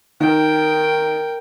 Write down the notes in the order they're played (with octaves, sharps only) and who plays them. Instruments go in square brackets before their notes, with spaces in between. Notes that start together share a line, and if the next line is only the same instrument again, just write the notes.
[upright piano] D#3 [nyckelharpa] A#4 G5